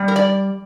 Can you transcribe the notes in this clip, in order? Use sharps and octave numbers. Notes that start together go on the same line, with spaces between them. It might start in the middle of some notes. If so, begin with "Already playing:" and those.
Already playing: G3
A#4
D5